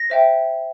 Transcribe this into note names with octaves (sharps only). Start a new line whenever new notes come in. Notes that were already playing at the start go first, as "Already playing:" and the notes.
Already playing: A#6
C5 E5 G5